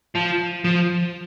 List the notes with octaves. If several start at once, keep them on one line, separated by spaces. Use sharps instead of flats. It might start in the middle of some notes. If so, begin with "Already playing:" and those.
F3
F3